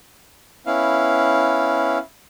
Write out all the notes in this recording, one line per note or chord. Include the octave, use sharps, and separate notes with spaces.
B3 C#4 E4 F5